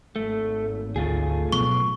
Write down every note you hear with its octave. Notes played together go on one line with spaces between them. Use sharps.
G#1 A3
D2 A3 F4 G#4
B2 F#3 B3 C#6